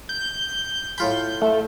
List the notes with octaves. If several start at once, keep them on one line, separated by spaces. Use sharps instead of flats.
G6
A2 F4 B5 G6
A3